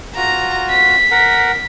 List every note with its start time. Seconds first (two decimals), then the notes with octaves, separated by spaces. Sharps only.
0.16 F4 F#4 A#5
0.70 B6
1.11 A#4 F#5